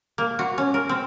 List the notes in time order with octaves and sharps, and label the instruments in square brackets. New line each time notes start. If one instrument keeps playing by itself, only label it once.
[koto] A#3
F#4
C#4
A#4
C4